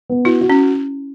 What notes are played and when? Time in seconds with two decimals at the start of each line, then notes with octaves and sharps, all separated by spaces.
0.09 B3
0.25 E4 F#4
0.41 F#4
0.50 C#4